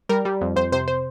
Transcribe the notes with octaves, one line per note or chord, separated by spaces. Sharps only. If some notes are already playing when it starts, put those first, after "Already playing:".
G3 A#4
G3
F2
F2 C5
C3 C5
C5